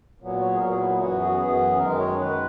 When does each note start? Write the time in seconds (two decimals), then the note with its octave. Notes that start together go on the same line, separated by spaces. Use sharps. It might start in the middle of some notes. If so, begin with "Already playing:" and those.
0.20 A#2 F#3 B3
0.40 C#5
0.52 G#4
0.59 A#2 F#3 B3 A#4
0.70 G#4
0.79 E4
0.90 E4
0.99 F#2 E3 B3 F#4
1.20 G#4
1.27 F#4
1.36 F#2 E3 B3 G#4
1.79 F#2 D#3 G#3 A#4
1.98 C#5
2.19 F#2 D#3 G#3 B4